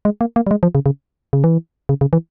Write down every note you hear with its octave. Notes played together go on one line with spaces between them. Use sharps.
G#3
A#3
A#3
G3
G#3
F3
C#3
C#3
C#3
E3
C#3
C#3
E3